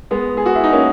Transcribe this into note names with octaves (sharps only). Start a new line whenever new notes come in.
G#3 B3
G#4
F#4
E4
D#4
A#3 C#4